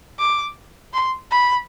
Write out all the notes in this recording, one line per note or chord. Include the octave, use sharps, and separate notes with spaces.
D6
C6
B5